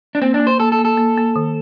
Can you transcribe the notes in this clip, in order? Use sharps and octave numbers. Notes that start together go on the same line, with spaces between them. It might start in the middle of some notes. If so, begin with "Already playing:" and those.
D4
A#3 C4
D4
A#3
C5
A#3 A4
A4
A#3
A4
A#3
A#3
D#3